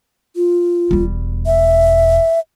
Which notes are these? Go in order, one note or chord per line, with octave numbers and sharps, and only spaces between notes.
F4
E1 G3
E5